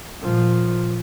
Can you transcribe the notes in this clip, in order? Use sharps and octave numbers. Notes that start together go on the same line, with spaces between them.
A#2 F3